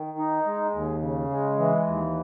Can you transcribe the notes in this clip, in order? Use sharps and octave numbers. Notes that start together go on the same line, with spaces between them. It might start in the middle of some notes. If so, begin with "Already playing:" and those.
Already playing: D#3
D#4
G#3
D#2
C#3
G#3
E3
D#2